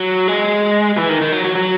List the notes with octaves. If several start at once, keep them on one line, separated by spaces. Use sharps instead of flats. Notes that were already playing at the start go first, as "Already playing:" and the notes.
Already playing: F#3
G#3
E3
D#3
D#3
F#3
F#3
F#3